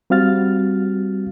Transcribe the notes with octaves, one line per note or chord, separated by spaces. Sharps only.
G3 C4 F#4 F5 F6 A6